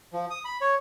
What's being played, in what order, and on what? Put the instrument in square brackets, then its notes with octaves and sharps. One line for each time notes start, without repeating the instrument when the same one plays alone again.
[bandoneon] F3
D#6
B5
C#5